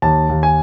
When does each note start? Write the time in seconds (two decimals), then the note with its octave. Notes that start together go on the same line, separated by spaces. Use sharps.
0.02 D#2 A5
0.29 D#2
0.43 G#5